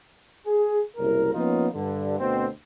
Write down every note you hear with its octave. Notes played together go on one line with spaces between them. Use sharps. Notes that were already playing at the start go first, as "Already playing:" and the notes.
G#4
F#1 C2 E4 A#4
F3 A#3 B3 C#4 D#4 F4
G2 D3
D2 B2 C4